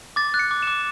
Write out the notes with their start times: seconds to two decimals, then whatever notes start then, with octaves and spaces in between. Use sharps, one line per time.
0.16 D6 A6
0.34 F#6
0.39 C#7
0.51 D6
0.62 D6 E7